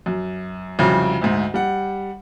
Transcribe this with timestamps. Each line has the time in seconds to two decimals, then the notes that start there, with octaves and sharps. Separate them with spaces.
0.06 F#2
0.79 C2 F2 C#3 F#3
1.21 D2 G#2
1.54 G3 F#5